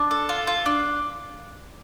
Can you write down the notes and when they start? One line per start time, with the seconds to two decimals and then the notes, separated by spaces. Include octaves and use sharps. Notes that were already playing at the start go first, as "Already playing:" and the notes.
Already playing: D4 A5
0.11 A4
0.29 F4
0.47 F4
0.66 D4